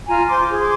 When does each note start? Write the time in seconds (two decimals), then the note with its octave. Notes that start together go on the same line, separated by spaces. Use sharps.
0.08 F4 G#5 A#5
0.29 C5 C6 D6
0.49 G#4
0.59 C6 D6